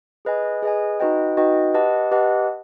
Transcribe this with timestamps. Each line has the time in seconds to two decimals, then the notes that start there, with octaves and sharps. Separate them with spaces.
0.25 G#4 B4 D#5 G#5
0.63 G#4 B4 D#5 G#5
1.00 D#4 F#4 B4 D#5 G5
1.37 D#4 F#4 B4 D#5 G5
1.74 G4 B4 D#5 F#5 A5
2.11 G4 B4 D#5 F#5 A5